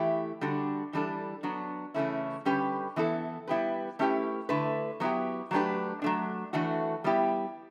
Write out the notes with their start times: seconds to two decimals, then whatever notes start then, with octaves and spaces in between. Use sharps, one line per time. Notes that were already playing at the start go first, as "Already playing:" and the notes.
Already playing: E3 A3 E4 G4
0.41 D3 G3 D4 F#4
0.93 E3 G3 D4 A4
1.43 F#3 B3 D4
1.94 C#3 E3 A3 C#4 E4
2.45 D3 G3 C#4 G4 B4
2.96 E3 B3 E4 A4
3.48 G3 B3 E4 G4 B4
3.99 A3 C#4 E4 G4 B4
4.49 D3 A3 E4 B4
5.00 F#3 B3 E4 G4
5.51 F#3 A3 D4 G4 B4
6.02 F#3 A3 D4
6.53 E3 A3 D4 F#4 B4
7.04 G3 B3 E4 G4